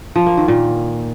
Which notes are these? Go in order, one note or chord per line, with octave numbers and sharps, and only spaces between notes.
F3
A#3
D#3
A#2